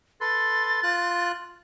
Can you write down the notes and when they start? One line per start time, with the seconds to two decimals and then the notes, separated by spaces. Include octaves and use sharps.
0.21 A4 B4 C6 A6
0.83 F4 F#6